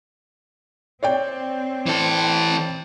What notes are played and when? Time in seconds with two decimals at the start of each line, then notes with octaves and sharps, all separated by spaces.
1.03 C4 C#5 D5 G5
1.86 E3 A4